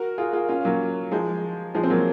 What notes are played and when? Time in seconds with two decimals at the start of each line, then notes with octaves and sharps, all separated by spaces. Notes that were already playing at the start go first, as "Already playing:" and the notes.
Already playing: F#4 A#4
0.18 F4 G#4
0.33 F4 G#4
0.49 C#4 F4
0.65 F#3 A#3
1.12 F3 G#3
1.74 F3 G#3
1.83 C4
1.90 F#3 A#3